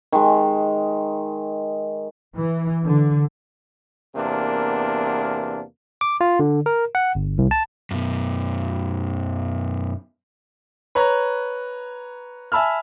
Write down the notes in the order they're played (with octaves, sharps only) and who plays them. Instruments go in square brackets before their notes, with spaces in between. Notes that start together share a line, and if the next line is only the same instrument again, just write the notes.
[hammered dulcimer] D#3 G#3
[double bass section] E3
D3
[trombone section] E2 C3 A#3 B3 D4 A#4
[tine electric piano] D6
F4
D3
A#4
F#5
G1
C2
A5
[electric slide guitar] F#2 B2
[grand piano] B4 C#5 A#5
E5 G#5 A5 B5 E6 F6